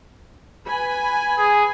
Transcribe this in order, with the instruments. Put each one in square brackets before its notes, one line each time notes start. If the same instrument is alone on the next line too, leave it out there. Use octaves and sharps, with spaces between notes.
[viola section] B4 G#5 B5
[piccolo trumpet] G#4